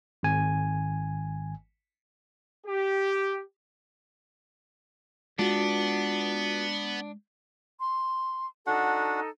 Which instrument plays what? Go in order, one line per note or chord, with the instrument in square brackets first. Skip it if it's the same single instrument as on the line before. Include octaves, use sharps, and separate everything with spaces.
[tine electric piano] G#1 G#5
[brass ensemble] G4
[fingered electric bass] G#3 [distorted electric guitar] B3 [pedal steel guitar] D4 [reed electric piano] F4 F#4
[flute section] C6
[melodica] D4 F#4 F#5 [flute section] D#4 A4